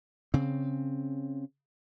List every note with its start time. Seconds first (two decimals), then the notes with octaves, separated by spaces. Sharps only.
0.34 C#3 C4